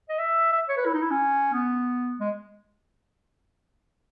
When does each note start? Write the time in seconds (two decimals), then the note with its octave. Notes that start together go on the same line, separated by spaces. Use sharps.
0.09 D#5
0.19 E5
0.52 E5
0.69 C#5
0.77 B4
0.85 E4
0.94 D#4
1.02 E4
1.11 C#4
1.53 B3
2.20 G#3